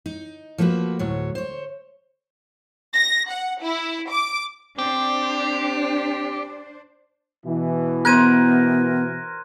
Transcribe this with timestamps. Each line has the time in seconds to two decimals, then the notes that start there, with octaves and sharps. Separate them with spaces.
0.06 D#4
0.58 F3 A3 A#3 F#4 B4
0.99 D2 A2 F#3 C#5
1.35 C5 C#5
2.94 A#6
3.30 F#5
3.62 E4
4.11 D6
4.79 C4 D4 G4 C5
7.46 B2 E3
8.05 B3 A#4 C5 F#6 G#6 D#7